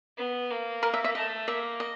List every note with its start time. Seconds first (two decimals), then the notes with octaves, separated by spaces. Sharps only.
0.18 B3
0.51 A#3
0.83 A#4
0.94 E5
1.04 E5
1.15 A3 D#5
1.48 A#3 E5
1.80 D#5